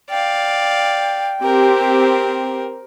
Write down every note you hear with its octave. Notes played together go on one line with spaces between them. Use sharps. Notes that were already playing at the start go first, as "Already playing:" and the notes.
D5 F5 G5
C4 G4 A#4 C5